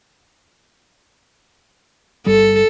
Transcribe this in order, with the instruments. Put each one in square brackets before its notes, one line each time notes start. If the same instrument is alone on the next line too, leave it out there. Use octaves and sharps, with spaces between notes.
[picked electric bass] G1 G3 [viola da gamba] A4